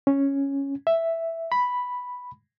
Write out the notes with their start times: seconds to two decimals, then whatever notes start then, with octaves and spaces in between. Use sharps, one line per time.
0.07 C#4
0.87 E5
1.52 B5